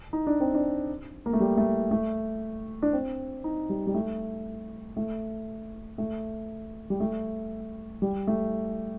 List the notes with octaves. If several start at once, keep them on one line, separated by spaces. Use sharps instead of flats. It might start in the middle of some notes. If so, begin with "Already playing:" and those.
D#4
D4
C4
D4
A#3
A3
G3
A3
A3
D4
C4
D#4
G3
G3
A3
A3
A3
G3
A3
G3
A3